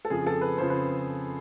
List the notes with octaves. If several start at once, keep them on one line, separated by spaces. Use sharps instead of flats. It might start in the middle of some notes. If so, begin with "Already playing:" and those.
A4
F2 C#3 F3 G#4
A4
B4
F2 C#3 F3 C5
B4